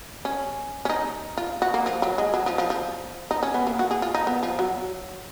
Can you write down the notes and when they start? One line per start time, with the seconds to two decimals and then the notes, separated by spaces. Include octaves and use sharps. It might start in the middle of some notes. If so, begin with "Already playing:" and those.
0.25 C#4
0.85 C#4
0.90 D#4
1.38 F4
1.62 F#4
1.74 A#3
1.86 F3
2.02 F#3
2.18 G#3
2.34 F#3
2.46 F3
2.58 F3
2.70 F3
3.31 D#4
3.43 C#4
3.54 B3
3.67 A#3
3.79 F#4
3.91 G#4
4.02 F4
4.15 D#4
4.27 B3
4.43 F3
4.59 F#3